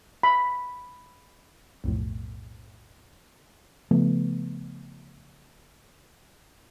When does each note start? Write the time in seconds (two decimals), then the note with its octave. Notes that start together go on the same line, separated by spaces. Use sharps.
0.23 B5
1.84 B1 F2 A2
3.91 C#3 F3 A3 B3